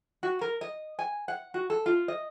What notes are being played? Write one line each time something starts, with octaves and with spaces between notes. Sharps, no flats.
F#4
A#4
D#5
G#5
F#5
F#4
A4
F4
D#5